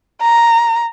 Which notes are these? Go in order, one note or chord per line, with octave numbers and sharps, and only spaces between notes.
A#5